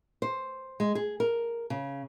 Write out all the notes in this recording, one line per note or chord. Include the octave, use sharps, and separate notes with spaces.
C5
G#3
G#4
A#4
C#3